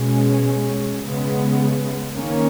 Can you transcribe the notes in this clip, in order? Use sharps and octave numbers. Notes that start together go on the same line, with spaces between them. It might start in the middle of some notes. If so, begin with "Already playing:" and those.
Already playing: B2 G#3 C#4
C#3 G#3 B3
D#3 A#3 C#4